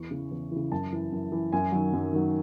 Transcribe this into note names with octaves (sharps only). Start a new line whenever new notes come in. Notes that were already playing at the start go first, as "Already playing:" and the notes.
Already playing: E2 C#6
C#3 E3
E2
C#3 E3
F#2 A5
E3
F#2
E3
F#2 G#5
D#3 F#3
F#2
D#3 F#3